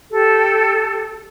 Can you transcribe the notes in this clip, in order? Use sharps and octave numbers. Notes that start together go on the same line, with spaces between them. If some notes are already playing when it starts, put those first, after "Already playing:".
G4 A4